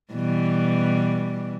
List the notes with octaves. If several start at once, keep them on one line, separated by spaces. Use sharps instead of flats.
B2 E3 G3